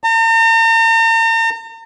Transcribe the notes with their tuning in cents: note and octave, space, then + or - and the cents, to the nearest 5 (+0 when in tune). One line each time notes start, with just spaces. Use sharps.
A#5 -45